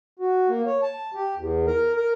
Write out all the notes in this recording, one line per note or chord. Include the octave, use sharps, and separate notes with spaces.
F#4
A#3
C#5
A5
G4
E2
A#4
A#4